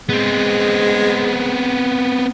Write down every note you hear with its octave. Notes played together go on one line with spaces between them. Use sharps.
G#3 B3 C4